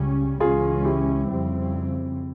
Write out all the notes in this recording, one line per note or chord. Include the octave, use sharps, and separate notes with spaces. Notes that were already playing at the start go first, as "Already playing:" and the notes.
Already playing: C#2 C#3 G3 C#4
C#2 C#3 E3 G#3 C#4 F4 G#4
E4 G4
F2 C#3 G3 C4